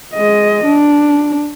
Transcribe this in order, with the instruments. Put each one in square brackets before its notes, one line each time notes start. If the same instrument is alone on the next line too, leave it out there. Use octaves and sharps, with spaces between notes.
[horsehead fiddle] G#3 D#5
D4